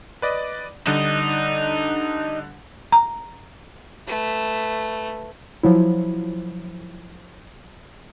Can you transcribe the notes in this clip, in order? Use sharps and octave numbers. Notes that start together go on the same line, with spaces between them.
B4 D5 D#5
D3 G3 D4 D#4 D#5
A#5
A3 B4
F3 F#3 E4